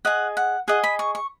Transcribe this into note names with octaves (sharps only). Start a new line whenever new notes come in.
G#4 D#5 F#5
F#5
G#4 D#5 F#5
B5
C#6
C#6